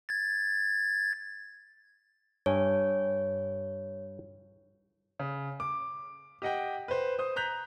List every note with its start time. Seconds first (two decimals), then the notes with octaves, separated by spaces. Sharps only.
0.09 G#6 A6
2.46 G2 C#5 G#5
5.19 C#3
5.60 D6
6.42 G4 D#5 F#5 G5
6.88 B4 C5
7.19 C5 D#6
7.36 A#5 F#6 G6 B6 F7